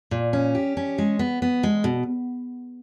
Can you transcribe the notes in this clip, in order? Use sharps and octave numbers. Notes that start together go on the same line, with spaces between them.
A#2
C#4
G4
C#4
G#3
B3
B3
G#3
B2